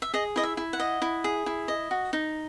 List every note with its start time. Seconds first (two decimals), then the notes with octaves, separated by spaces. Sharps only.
0.02 E5
0.14 G#4 D#5
0.36 E4 D#5
0.43 E5
0.57 E4
0.73 F#5
0.80 D#5
1.02 E4
1.24 G#4
1.46 E4
1.68 D#5
1.91 F#4
2.13 D#4